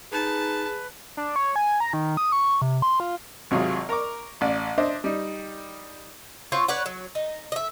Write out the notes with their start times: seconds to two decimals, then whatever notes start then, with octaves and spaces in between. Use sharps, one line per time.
0.12 D#4 G#4 B4 A5
1.17 D4
1.36 C#5
1.56 G#5
1.80 A#5
1.93 D#3
2.17 D#6
2.32 C#6
2.62 C3
2.82 C6
3.00 F4
3.51 G#1 C3 F#3 F4 G#4
3.89 A#4 A#5 C#6 D6
4.41 A1 D5
4.78 D4 C5 D#5 E5
5.04 G3 D#4
6.52 C4 F4 F#4 C#5
6.68 B4 C#5 D5 F#5
6.86 F#3
7.15 D#4
7.52 D#5 E5